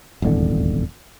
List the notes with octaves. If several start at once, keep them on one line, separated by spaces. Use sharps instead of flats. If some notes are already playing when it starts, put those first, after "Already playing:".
D#1 G#1 E2 D3